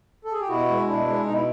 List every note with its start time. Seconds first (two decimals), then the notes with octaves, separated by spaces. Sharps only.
0.25 A4
0.32 G#4
0.40 G4
0.48 B2 E4 F#4
0.68 G#3
0.86 B2 D4 E4
1.06 G#3
1.25 B2 D#4
1.33 E4